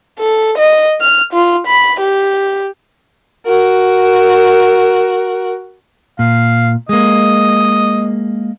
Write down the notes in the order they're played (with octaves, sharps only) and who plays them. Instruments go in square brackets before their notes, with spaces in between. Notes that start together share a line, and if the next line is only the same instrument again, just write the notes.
[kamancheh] A4
D#5
F6
F4
B5
G4
F#4 A#4
[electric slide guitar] A#2 [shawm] F5
[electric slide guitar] G#3 A#3 [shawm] D#5